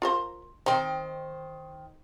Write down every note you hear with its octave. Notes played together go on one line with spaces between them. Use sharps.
F4 A#4 C5
D#3 C4 D#4 C5